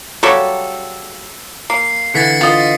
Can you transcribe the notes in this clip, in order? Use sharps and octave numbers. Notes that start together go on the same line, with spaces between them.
C#3 F#3 G3 A4
A#3 C7
D3 E3 A6 B6 C#7
F4 D#5